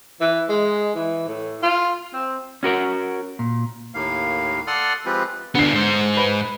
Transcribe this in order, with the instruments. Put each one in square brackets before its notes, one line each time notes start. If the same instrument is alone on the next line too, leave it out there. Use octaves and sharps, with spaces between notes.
[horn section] E3
G#3
E3
A2
F4
C4
[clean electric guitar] C#4 F#4 A#4 F#5
A#2
[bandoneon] D#2 A2 A#3 F5
A4 D5 F#5 C6 D#6 F6
F3 G#3 C4 F4 G4 B4
[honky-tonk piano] D3 C7 [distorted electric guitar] B3 D4
[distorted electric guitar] G#2 C5
[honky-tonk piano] B4